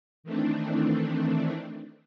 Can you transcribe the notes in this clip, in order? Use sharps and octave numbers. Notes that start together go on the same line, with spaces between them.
D#3 E3 A3 C4 D4